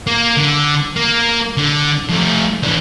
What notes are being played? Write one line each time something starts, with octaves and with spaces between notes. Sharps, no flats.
A#3
D3
A#3
D3
F3 A3
E3 D4